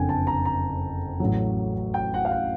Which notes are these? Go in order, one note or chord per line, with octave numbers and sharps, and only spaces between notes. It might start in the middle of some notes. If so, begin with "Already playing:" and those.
Already playing: F#1 F2 D3 G5 G#5
A5
A#5
A#5
A1 A2 F#3
G5
F#5
F5
F#5